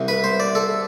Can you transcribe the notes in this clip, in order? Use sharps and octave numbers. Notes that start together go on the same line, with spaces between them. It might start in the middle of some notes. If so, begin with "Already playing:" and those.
Already playing: C2 C3 E3
B4
C5
D5
A4